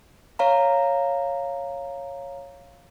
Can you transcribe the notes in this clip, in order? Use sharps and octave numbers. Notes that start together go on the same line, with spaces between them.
C#5 F5 A#5